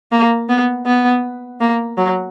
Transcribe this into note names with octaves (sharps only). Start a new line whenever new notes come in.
A#3
B3
B3
A#3
F#3